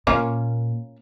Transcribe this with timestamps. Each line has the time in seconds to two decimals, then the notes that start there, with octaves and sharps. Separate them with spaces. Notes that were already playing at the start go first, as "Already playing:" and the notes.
0.07 A#2 A#3 C#4 F4